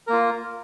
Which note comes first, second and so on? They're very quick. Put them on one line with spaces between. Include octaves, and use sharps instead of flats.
A#4 A#3 F4